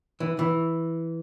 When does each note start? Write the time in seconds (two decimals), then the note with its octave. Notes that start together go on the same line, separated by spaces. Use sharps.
0.20 E3
0.39 E3